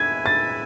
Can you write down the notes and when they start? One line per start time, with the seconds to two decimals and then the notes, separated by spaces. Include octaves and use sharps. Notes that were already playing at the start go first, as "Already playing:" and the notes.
Already playing: E4 B4 E5 G#5 G#6
0.26 A6